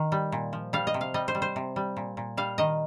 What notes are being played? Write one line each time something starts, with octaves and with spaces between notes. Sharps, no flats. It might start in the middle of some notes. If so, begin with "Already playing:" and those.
Already playing: D#3
G3
A#2
F3
G3 F5
D#5
C3
F5
G3 D#5
C5
G3
C5
C3
G3
A#2
A#2
G3 F5
D#3 D#5